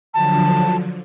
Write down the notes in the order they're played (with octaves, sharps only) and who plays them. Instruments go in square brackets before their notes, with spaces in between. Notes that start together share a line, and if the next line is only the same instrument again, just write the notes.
[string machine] D3 F3 F#3 [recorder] A5